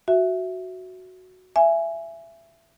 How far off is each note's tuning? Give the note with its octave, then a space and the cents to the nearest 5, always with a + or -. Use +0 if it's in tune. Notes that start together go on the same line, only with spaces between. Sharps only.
F#4 +0 E5 +0
E5 +20 G#5 +0